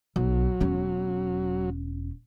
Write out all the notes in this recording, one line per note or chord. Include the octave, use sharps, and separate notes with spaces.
B1 F#3
E1 C#4